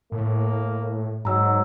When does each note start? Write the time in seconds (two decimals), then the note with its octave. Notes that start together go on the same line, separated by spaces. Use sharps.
0.12 A2 A#3
1.25 G#2 F#3 A#5 E6